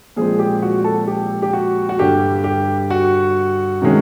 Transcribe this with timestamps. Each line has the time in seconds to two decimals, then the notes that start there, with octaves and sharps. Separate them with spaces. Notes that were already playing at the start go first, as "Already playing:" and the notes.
0.16 A#2 F3 G#3 C4 G#4
0.39 G4
0.62 F#4
0.84 A4
1.07 G4
1.42 G4
1.53 F#4
1.89 F#4
1.99 G2 D3 G3 G4
2.44 G4
2.90 F#4
3.82 C3 D#3 G#3 C#4